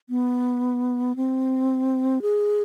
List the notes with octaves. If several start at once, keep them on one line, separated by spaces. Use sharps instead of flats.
B3
C4
G#4